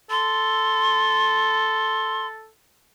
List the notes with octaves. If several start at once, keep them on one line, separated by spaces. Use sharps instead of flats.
A4 C6